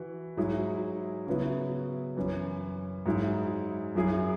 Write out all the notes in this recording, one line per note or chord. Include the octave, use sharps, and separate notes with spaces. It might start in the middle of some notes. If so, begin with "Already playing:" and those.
Already playing: E3 F#4
G#2 F#3 E4 G#4
C#3 F#3 B3 E4
F#2 E3 C#4
G#2 F#3 E4 G#4
F#2 F#3 E4 G#4